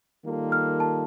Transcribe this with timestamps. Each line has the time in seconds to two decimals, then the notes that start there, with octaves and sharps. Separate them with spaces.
0.24 D#3 G3 A#3 F4 A4
0.52 F6
0.80 A5